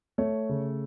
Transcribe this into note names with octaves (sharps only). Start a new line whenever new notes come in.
A3 C#5
C#3